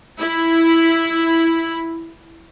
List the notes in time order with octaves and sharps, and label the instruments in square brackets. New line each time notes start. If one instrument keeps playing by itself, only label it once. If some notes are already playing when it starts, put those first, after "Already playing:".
[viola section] E4 B5